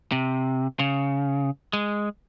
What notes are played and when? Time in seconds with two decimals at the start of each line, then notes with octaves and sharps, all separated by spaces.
0.12 C3
0.79 C#3
1.73 G#3